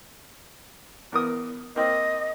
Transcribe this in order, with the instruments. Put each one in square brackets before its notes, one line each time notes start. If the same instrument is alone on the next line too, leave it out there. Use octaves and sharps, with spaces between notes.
[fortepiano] E2 A#4 D#6
[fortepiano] A#3 C4 [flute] D#5